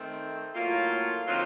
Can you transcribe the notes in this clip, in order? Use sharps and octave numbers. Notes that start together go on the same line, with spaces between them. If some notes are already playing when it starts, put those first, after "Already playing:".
Already playing: D#3 A3 C4
A2 F#3 A#3 F4
D#3 F#3 C4 F4